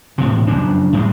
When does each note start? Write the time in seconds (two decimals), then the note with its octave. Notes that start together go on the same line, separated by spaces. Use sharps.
0.18 E1 A2 C3
0.48 F#1 F2 D4
0.93 A2 G3 G#3